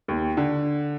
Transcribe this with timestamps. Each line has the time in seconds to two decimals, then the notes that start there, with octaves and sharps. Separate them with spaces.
0.08 D#2
0.37 D3